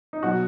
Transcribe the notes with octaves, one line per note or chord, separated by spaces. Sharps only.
D#4
B2 F#3 F#4